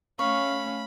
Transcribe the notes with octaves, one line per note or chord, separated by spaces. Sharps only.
A3 C#4 F5 B5 C#6